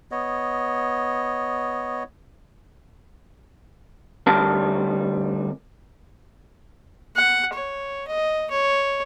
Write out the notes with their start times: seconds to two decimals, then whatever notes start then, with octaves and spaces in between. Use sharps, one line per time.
0.11 B3 C#5 D#5
4.27 D2 G3 C4 A#4 A5
7.16 F#5
7.53 C#5
8.07 D#5
8.50 C#5